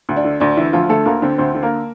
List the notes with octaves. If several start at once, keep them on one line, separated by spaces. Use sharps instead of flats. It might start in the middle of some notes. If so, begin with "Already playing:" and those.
D2
D4
D3
D2 D4
D3 E3 E4
D2 F3 F4
D3 A3 A4
D2 A#3 A#4
D3 C4 C5
D2 C4 C5
D3
A#3 A#4